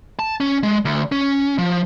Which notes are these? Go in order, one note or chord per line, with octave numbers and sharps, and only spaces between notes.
A5
C#4
G#3
D2
C#4
F3